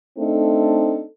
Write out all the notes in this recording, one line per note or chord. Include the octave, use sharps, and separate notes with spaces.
A3 C4 D4 D#4 A4